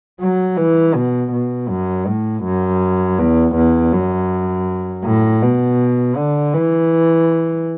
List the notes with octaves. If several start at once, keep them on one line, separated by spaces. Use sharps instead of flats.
F#3
E3
B2
B2
F#2
A2
F#2
E2
E2
F#2
A2
B2
D3
E3